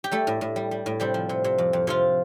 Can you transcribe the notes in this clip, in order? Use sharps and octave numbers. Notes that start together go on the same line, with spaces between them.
G4
G3 A3 A4
A2
A2
G3
G3
A2
C3 G3 G4
F3
C3
C3
F2
F2
C3 F3 F4